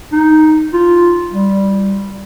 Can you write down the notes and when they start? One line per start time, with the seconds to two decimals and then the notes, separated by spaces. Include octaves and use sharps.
0.12 D#4
0.73 F4
1.31 G3